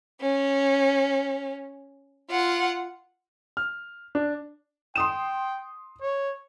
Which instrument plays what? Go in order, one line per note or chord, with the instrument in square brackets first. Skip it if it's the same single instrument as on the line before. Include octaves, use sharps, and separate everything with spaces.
[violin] C#4
F4 F#5
[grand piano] F6
D4
[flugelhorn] G5 [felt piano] C6 D#6 E7
[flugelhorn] C#5